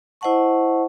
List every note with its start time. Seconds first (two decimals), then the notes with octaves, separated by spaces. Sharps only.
0.21 E4 C5 D#5 F#5 A5 C#6